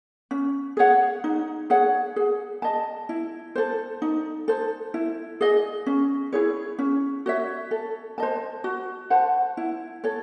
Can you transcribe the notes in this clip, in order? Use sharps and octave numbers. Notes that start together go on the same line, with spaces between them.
C#4
G#4 C#5 F#5
D#4
G#4 C#5 F#5
G#4
D#5 A5
E4
A4 C5
D#4
A4 C5
E4
G#4 D#5
C#4
E4 G#4 C#5
C#4
F#4 C#5 E5
A4
C5 D#5 A5
F#4
C5 F#5 A5
E4
A4 C#5